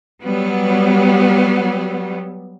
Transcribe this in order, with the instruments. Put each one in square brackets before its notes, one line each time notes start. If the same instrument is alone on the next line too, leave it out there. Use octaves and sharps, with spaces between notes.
[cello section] F#3 G3 B3